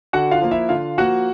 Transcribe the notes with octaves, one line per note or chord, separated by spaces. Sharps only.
D3 F#4 F#5
F4 F5
F3 A#3
E4 E5
D3 F4 F5
F3 A#3 F#4 F#5